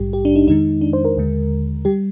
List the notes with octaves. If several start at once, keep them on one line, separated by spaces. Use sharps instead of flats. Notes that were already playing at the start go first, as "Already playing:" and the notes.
Already playing: A#1 G#2 G3 G4
G4
D4
D#4
F2 D#3 G#3 D#4
D4
C5
A#4
D#2 D3 G#3
G3 G4